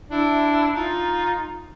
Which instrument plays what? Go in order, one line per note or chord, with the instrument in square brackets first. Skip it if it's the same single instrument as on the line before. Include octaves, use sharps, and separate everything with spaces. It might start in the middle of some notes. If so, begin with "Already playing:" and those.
[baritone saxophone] D4 [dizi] E4
[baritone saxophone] D#4 [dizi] F4